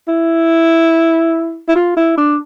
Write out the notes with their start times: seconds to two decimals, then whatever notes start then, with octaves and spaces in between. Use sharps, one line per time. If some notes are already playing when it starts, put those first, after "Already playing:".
0.08 E4
1.68 E4
1.75 F4
1.97 E4
2.17 D4